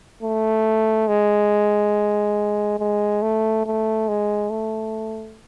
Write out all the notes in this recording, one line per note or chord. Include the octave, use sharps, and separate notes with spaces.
A3
G#3
G#3
A3
A3
G#3
A3